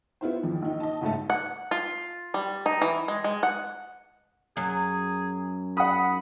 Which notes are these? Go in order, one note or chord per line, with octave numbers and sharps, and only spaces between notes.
B3 E4 F4 C5
E2 D#3 F3
A#1 D#4
D#5 A5
F#1 G#2 A3 A5
F#5
F4
G3
D#4
E3
G#3
G#3
F#5
F#2 G#4
F#5 B5 D#6